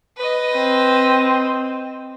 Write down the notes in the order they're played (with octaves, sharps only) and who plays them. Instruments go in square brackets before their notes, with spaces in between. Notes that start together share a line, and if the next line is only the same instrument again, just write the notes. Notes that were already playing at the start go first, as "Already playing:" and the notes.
[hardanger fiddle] B4 D#5
[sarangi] C4